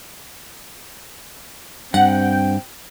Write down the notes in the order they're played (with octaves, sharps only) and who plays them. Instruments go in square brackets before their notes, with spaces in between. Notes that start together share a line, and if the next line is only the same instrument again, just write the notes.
[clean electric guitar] G2 [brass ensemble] C4 G5 [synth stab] F#5